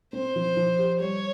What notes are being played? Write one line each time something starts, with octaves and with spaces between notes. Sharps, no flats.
C4 C5
F3
F3
G4
G3 C#5